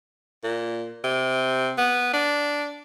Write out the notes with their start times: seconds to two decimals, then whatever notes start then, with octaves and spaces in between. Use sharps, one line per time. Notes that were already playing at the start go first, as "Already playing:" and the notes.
0.44 A#2
1.04 C3
1.78 B3
2.13 D4